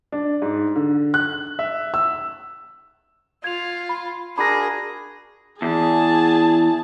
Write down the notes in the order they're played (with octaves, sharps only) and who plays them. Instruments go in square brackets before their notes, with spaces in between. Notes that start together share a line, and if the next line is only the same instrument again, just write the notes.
[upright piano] D4
G#2
D3
F#6
E5
E6
[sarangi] F4 [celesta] G#6 F7
[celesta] B5
[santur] D4 F#4 A#4 [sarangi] G#4 [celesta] B5 A#6
[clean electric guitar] E2 [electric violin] G#4 A5